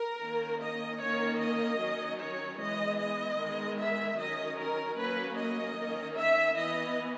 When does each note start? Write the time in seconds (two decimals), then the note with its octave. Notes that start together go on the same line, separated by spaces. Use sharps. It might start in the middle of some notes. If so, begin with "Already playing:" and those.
Already playing: A#4
0.21 D#3 A#3 C#4
0.60 D#5
1.01 D#3 A#3 C#4 C#5
1.40 D#5
1.79 D#3 F#3 C#4
2.19 C#5
2.60 E3 G#3 B3 D#5
2.99 D#5
3.38 D#3 G#3 B3
3.78 E5
4.17 D#3 F#3 C#4 D#5
4.57 A#4
4.97 F#3 A#3 C#4 B4
5.37 D#5
5.76 D#3 A#3 C#4
6.16 E5
6.56 E3 B3 D#5